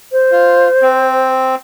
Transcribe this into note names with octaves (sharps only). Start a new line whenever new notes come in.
C5
F4
C4